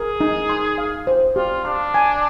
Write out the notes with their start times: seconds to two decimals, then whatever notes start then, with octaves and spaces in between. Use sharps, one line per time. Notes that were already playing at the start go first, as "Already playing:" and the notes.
Already playing: G#4 A#4
0.21 D#4
0.49 C6
0.78 F5
1.07 C5
1.36 F4 G4
1.65 D4 C6
1.94 G#5